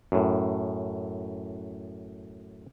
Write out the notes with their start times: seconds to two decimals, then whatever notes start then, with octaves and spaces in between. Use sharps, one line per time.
0.12 F#2 A2